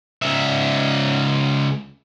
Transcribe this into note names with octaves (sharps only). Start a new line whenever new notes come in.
C#2 E5